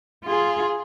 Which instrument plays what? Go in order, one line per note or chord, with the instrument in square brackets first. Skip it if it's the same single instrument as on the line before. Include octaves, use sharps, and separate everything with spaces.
[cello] F4 G#4